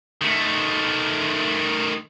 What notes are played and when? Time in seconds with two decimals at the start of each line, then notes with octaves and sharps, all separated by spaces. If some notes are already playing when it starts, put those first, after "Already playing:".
0.22 D#3 A3